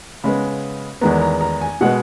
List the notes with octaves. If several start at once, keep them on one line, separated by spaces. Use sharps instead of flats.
C#3 G#3 B3 B5
E2 D#3 G#3 B3 A#5
A#5
A#5
G#5
B2 G#3 B3 F#5